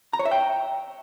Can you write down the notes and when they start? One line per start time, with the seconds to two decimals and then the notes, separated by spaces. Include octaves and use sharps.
0.13 A#5
0.19 C#5
0.25 E5
0.31 G5